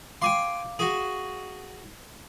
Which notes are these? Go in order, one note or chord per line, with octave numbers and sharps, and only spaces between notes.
F5 G5 G#5 C6 D6
F#4 G#4